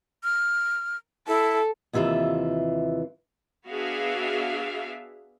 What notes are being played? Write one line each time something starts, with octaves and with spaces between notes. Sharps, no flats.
F6
E4 A4
D#2 C3 E3 F4 E5
B3 D4 F#4 G#4 E5 F5